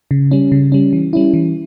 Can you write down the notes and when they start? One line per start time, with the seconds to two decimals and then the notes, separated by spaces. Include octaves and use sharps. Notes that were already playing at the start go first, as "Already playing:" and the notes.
0.11 C#3
0.31 G3 C#4
0.52 C#3
0.72 G3 C#4
0.93 E3
1.13 G3 C#4 E4
1.34 E3